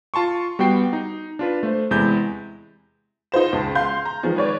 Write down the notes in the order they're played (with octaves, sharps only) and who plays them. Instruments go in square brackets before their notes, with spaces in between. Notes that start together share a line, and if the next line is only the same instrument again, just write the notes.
[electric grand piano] F4 A5 C6 C#6
G3 B3 F#4 G5 C7
D#4
D4 F4 B4
A3 C5
E2 C3 G#3 E4 G6
[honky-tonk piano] D#4 F4 C5 E7
C#2 A5
F5 C6 G6
A#5
D#3 F3 G#3
B4 C#5 D5